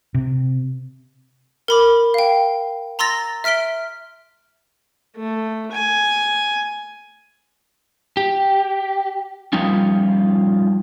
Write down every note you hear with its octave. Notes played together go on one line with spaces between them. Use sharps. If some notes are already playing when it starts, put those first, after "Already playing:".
C3
A#4 B5 D6
F5 G5
A#5 C6 E6 A6 A#6
E5 F6 B6 D7 G7
A3
G#5
G4
F3 G3 C#4 D#4 F4